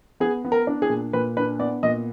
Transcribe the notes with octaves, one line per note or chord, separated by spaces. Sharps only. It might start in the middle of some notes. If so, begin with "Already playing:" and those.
B3 G#4
B3
A#4
D4
G#4
A#2
A#2 B4
D4 B4
B3 D5
A#2 D#5